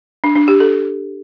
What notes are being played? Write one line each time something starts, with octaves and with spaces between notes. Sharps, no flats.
D4
D4
G4
A4